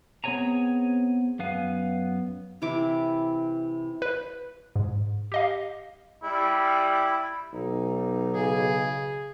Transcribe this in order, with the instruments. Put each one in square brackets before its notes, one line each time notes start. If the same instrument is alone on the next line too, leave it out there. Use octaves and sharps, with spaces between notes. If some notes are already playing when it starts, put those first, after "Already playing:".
[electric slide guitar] B3 C4 G#4 C#5 G#5 A#5
F#2 B3 F5 G#5
[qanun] C3 E3 E4 D6
[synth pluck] B4
G#2
G4 D#5 F5
[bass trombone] G3 [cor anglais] E4
[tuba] B1 [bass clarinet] D#4
[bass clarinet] C#3 [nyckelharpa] G#4